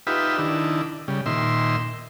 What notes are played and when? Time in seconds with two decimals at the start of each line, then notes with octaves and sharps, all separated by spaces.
0.07 D#4 F4 G4 B4 E5
0.38 D#3 D4 E4
1.08 C#3 G3
1.26 A#2 D#3 E5 C6